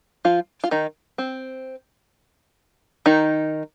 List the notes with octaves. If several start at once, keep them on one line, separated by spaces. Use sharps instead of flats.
F3 F4
F4
D#3 D#4
C4
D#3 D#4